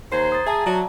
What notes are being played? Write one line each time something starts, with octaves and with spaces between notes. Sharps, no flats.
D#2 C5 A#5 G#6 C7
D#6 A6
G#4 E5 A5 A#5
F#3 D5